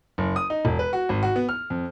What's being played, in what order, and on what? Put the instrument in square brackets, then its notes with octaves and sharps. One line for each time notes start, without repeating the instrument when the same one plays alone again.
[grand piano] F#1
D#6
D#4
E1
B4
F#4
G#1
F#4
B3
F6
F2